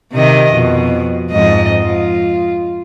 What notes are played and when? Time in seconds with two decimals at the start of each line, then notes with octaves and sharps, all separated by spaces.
0.12 C3 D#3 D#5
0.52 F2 B2
1.31 F2 G#2 D#5
1.83 F4